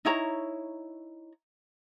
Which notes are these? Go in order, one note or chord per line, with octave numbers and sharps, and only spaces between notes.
D#4 E4 C#5 A#5